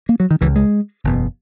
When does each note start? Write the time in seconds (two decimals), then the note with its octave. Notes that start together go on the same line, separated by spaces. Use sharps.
0.09 A#3
0.20 F#3
0.31 D#3
0.41 C#2 C#3 E3
0.56 G#3
1.04 F#1 E2 B2